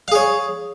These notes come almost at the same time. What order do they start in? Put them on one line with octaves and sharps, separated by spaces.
F5 G#4 C#5